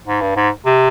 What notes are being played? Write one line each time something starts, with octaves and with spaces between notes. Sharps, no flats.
G#2
G2
G#2
C3